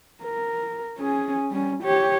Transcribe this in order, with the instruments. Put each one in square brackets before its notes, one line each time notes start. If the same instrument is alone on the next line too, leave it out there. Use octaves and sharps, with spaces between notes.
[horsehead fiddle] A#4
C#4 G#4
G3 C#4
G4 C#5